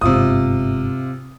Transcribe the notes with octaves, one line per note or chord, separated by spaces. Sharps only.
G1 G#2 C3 F4 D#6